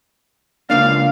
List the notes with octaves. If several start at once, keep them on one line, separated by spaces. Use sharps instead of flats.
C#2 A#3 D4 F5